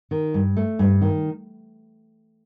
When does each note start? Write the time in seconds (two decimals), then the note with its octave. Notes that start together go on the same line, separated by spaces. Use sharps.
0.11 D#3
0.34 G2
0.57 A3
0.79 G2
1.01 D#3